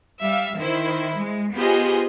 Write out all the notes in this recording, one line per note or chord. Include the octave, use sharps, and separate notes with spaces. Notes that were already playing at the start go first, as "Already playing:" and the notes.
G3 E5 F5
D#3 E4 C5
G#3
B3 F4 G4 G#4 C5 D#5